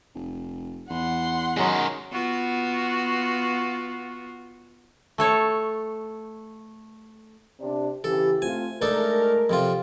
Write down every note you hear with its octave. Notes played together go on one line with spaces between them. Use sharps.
F1
E2 F#5 C6
F#2 D#3 F#3 G#3
B3 F4 F#4
A3 A4 C#5
C3 D4
C#3 E3 G4 A4
A3 C4 F4 G#5
G#3 A3 D4 D#4 A4 A#4
F2 C3 F4